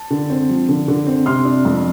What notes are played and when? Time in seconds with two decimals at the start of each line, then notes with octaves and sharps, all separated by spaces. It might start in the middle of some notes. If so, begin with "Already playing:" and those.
Already playing: A5
0.11 D3
0.30 C4
0.49 F3
0.69 D3
0.88 D3
1.07 C4
1.26 C3 C6 F6
1.45 D4
1.65 F2